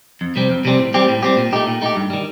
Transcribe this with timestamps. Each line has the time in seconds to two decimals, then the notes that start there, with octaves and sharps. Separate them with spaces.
0.21 F2
0.36 C3 G3 C4
0.49 F2
0.65 C3 G3 C4
0.79 A2
0.94 G3 C4 G4
1.08 A2
1.23 G3 C4 G4
1.37 A#2
1.53 A3 D#4 G4
1.67 A#2
1.82 A3 D#4 G4
1.96 G2
2.10 D#3 G3